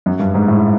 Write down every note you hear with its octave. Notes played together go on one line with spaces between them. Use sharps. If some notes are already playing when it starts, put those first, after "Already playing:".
F#2
G2
G#2
A2